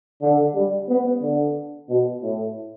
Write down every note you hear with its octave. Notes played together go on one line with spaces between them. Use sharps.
D3
G3
B3
D3
B2
A2